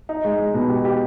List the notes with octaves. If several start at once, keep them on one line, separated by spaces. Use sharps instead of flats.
D#4
G#3
G#3
B2
G4
G4